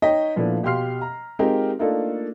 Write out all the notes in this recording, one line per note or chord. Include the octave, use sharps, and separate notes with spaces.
D#4 C#5 D#5 G5 A#5 B6
A#2 F3 A3 B3 D4 E4
B2 G4 F5 C6 F6 C7
A#5
G#3 C4 D#4 F4 G4 A#4
A3 A#3 D4 D#4 F4 A4